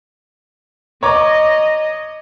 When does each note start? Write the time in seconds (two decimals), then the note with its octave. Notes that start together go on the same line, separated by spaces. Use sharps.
1.03 C#5 D#5 A#5 D6